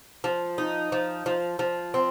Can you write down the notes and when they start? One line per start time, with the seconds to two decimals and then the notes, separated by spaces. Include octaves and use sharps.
0.24 F3
0.58 D#4
0.92 F3
1.26 F3
1.59 F3
1.94 C4